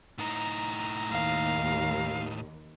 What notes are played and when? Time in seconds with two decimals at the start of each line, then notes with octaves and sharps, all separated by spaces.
0.18 A2 D#4 A#5
1.11 D#2 F5